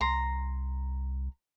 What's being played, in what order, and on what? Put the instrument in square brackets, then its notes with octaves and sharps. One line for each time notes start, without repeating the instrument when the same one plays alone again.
[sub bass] C2 [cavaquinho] A#5 C6